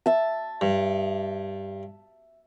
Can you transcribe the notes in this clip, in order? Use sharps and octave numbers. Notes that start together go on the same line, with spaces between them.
E5 A5
G2